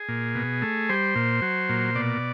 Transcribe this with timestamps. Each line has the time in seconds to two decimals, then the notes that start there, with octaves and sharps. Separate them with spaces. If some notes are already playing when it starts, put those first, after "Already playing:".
Already playing: G#4
0.09 A#2
0.35 B2
0.62 A3
0.89 G3 C5
1.16 A#2
1.42 F#3
1.69 A#2
1.95 B2 D5